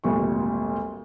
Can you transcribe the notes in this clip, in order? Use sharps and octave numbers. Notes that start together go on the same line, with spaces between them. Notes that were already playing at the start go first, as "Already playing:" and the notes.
G#1 D2 A#2 G3 C#6